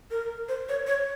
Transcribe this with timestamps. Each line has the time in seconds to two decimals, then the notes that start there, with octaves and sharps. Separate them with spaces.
0.11 A#4
0.49 C5
0.69 C#5
0.87 C#5